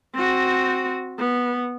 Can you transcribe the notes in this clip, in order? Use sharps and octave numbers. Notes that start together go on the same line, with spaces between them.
C4 F#4
B3